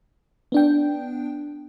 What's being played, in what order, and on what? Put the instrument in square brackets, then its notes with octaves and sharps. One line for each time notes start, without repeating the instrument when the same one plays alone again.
[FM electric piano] B3 D4 G5